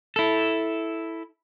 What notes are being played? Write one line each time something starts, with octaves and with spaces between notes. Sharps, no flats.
E4 A4